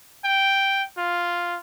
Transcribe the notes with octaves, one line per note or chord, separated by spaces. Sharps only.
G5
F4